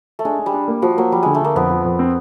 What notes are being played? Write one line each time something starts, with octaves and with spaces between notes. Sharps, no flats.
A3
G#3 D4
D4
G3
D4
A#3
F3 F#4
F#3 A#3
F3 G3
D3 G#3
A3
D3 A#3
F2 B3
F3
F2
C4